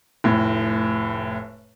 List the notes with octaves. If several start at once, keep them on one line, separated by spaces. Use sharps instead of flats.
F1 A2